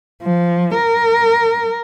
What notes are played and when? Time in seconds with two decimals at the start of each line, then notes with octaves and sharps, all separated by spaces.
0.23 F3
0.76 A#4